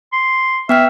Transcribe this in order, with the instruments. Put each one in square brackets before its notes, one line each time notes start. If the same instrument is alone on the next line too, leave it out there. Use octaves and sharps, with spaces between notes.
[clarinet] C6
[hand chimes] B3 G5 F6 [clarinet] E5